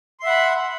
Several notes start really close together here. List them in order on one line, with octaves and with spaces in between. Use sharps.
C6 E5 F#5 B5